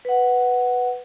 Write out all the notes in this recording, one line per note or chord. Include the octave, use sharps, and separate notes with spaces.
B4 F#5